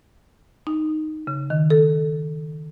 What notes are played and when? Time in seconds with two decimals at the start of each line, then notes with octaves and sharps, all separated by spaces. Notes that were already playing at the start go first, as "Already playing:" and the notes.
0.67 D#4
1.27 C#3
1.50 D#3
1.70 A4